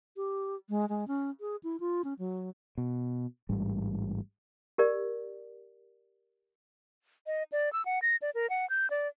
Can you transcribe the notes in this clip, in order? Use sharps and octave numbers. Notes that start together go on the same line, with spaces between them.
G4
G#3
G#3
C#4
G#4
E4
F4
C#4
F#3
B2
A1 G#2 G3
G4 A#4 D5
D#5
D5
E6
F#5
A#6
D5
A#4
F#5
G6
D5